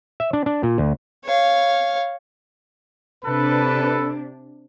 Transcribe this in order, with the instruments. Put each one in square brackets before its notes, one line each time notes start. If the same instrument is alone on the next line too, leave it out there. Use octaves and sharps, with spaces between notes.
[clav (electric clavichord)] E5
D4
D4
A#2
D2
[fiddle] C#5 F5
[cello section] C3 D4 [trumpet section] A4 B4